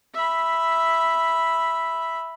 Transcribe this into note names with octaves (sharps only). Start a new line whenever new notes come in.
E5 B5